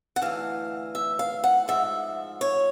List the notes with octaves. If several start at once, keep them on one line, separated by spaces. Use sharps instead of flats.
F#5
D2 C3 E3 F5
E5
F5
F#5
G#2 F3 E5
C#5